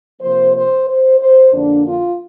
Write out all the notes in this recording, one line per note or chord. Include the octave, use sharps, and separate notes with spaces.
C3 F3 A#3 C5
C5
C5
C5
F2 D3 A#3 D4
F4